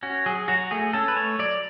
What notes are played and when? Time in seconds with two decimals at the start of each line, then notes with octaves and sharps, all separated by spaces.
0.03 C#4 F#4
0.26 F#3 G#4
0.48 F#3 F#4
0.71 A3 G#4
0.93 C#4 A4
1.08 B4
1.16 A3 C#5
1.39 F#3 D5